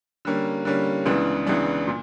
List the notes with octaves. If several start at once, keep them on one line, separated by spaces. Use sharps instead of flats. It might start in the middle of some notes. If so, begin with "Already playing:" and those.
D3 G3 A#3 C#4
D3 G3 A#3 C#4
C#2 C#3 E3 B3 D4
C#2 C#3 E3 B3 D4
A#2